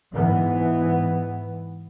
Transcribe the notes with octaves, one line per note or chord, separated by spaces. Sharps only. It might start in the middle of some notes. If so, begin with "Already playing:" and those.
G#2 E3 B3